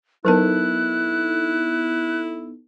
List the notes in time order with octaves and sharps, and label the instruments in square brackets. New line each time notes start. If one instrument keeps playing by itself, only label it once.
[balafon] F#3 A#4 A5 [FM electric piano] B3 D#4 A4 [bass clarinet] E4 [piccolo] F#6